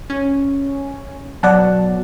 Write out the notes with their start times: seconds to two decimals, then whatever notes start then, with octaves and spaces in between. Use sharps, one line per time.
0.10 C#4
1.43 B2 F#3 D5 F#5 A5